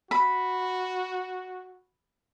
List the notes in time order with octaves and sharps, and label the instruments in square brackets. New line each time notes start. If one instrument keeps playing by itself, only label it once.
[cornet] F#4 [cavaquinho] B5